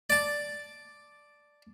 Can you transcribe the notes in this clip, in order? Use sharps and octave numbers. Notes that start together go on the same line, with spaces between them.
D5 A5